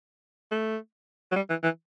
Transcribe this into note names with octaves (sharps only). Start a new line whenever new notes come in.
A3
F#3
G3
E3
E3